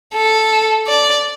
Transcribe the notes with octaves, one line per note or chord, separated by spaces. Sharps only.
A4
D5